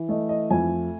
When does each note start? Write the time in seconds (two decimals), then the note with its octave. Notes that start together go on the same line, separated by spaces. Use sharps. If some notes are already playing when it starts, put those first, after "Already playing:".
Already playing: E3
0.09 A3 D#5
0.29 D#5
0.50 F2 G#5